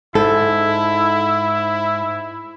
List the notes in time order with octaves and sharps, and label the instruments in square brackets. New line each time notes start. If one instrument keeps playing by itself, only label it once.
[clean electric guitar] G#2 [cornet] E4 [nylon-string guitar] A4